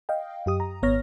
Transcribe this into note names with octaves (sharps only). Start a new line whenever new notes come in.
D#5 F5 G5
F#2 G4 D#6
A#5
G#1 B3 C#5 F6 A#6